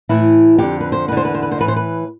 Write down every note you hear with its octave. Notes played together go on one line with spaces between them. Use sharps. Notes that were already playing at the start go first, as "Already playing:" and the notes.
A2 E3 E4
F2 D3 G4
B4
C5
E2 D3 B4
C5
B4
C5
B4
C5
A2 E3 B4
C5
B4